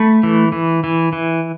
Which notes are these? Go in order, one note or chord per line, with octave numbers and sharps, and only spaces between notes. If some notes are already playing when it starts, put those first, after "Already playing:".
Already playing: A3 B5
E3
E3
E3
E3